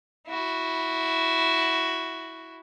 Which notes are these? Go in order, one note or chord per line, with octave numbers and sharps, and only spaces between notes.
E4 F#4